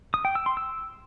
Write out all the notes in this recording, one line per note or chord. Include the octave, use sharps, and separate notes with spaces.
D#6
G5
E6
C6
E6